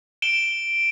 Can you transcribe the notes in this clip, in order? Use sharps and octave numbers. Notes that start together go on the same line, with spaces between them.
D7 E7 G7